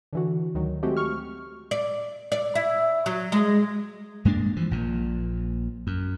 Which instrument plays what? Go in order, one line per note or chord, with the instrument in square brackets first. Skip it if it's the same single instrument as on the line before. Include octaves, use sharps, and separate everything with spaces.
[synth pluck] D3 E3 F#4
D2 D#3 F#3
G#3 A3 C4 F#4 G4
C#6 F6
[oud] D5
D5
E4
F#3
G#3
[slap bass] G2 G#3 A#3 D4
E3 F3
A#1 A#2
F#2